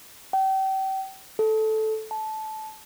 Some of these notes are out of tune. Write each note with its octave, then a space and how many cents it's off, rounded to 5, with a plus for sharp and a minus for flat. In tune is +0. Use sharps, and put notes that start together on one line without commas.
G5 -35
A4 -10
A5 -15